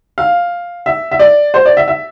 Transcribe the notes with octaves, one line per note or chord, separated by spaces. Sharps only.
F5
E5
E5
D5
C5
D5
E5
E5